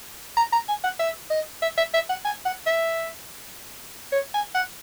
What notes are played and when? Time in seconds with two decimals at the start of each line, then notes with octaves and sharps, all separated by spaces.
0.37 A#5
0.53 A#5
0.68 G#5
0.84 F#5
1.00 E5
1.30 D#5
1.62 E5
1.78 E5
1.94 E5
2.09 F#5
2.25 G#5
2.45 F#5
2.66 E5
4.12 C#5
4.34 G#5
4.55 F#5